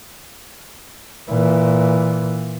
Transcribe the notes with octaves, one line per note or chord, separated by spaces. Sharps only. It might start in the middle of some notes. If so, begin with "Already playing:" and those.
A#2 E3